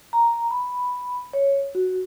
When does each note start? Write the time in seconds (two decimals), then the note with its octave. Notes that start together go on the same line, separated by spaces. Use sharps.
0.13 A#5
0.51 B5
1.33 C#5
1.75 F#4